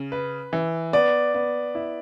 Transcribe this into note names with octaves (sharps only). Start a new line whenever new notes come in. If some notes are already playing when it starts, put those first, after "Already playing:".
Already playing: C#3
B4
E3
B3 D5
B3
E4